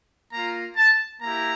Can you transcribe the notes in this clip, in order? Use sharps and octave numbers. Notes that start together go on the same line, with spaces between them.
A#3 F4 A#5
A5
A#3 E4 G4 A#5